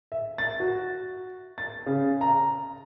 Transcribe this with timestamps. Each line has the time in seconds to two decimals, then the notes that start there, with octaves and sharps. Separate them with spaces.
0.12 E5
0.38 A6
0.60 F#4
1.58 A6
1.86 C#3
2.21 A#5